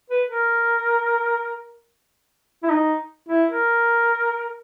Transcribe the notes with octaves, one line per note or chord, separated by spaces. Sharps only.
B4
A#4
E4
D#4
E4
A#4